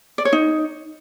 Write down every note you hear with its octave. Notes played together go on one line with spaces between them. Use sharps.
D5
C#5
D#4